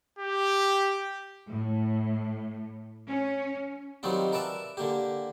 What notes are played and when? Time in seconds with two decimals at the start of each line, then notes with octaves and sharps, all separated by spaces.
0.19 G4
1.49 A2
3.07 C#4
4.03 D#3 F#3 G3 C4 D#4 F4
4.33 A#4 B4 D5 E5 A5
4.77 D3 A#3 G4